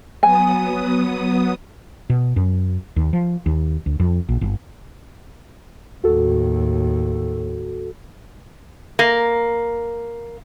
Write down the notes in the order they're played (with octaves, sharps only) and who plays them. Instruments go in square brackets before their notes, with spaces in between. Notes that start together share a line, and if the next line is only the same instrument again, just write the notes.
[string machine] F#3 B3 D#6 [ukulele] G#5
[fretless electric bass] B2
F#2
D#2
F3
D#2
D2
F2
A#1
G1
[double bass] D#2 A2 [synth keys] F#4 A4
[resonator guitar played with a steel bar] A#3